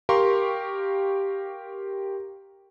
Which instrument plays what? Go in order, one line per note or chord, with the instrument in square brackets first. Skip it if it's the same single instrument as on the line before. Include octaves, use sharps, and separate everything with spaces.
[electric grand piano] G4 A#4 F5 C6 C#6